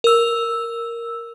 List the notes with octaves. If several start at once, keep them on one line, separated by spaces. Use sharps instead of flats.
A#4 E6